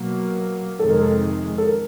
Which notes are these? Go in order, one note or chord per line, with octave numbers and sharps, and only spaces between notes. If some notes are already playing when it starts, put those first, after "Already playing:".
Already playing: B2 F#3 A#3
F2 C3 D#3 G#3 A4
A#4
A4
A4
A#4